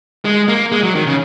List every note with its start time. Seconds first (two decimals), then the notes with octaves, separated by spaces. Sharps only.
0.25 G#3
0.48 A#3
0.72 G#3
0.83 F#3
0.95 D#3
1.07 C#3